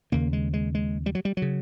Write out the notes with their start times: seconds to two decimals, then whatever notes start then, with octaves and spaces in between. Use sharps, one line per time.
0.12 D#2 C#3 A#3
0.33 G#3
0.53 G#3
0.75 G#3
1.06 G3
1.15 F#3
1.25 G3
1.37 C#3 F#3